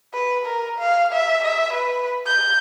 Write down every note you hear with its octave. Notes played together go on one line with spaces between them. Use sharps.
B4
A#4
F5
E5
E5
B4
G6